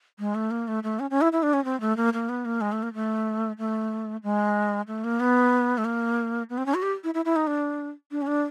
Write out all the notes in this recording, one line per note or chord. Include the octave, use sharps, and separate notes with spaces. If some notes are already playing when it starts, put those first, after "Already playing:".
G#3
A3
A#3
A3
A3
C#4
C#4
E4
E4
D4
C#4
C4
A3
A#3
A#3
B3
A#3
G#3
A3
A#3
A3
A3
G#3
A3
A#3
B3
A3
A#3
B3
C4
C#4
F#4
G4
E4
E4
E4
D#4
D4
D4
C#4
D4